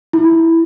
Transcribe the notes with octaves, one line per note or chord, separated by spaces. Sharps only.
E4